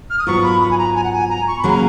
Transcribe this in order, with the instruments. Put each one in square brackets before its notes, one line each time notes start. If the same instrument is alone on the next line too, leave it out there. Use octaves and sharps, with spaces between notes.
[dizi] F6
D#6
[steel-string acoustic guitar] G#2 F#3 B3 F4 A#4 [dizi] C#6
[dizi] B5
B5
G#5
A#5
G#5
F#5
G#5
A#5
C#6
B5
[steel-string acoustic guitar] C#3 F#3 A#3 C#4 G#4
[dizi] A#5